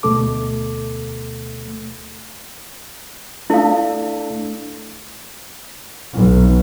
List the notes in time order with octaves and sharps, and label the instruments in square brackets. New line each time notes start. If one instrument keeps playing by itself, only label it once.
[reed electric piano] D2 B2 A3 A4 D6
[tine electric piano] A3 D4 A4 [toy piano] E4 F5
[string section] B1